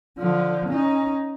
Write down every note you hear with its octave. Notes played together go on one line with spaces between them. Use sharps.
D3 F3
C#4 D#4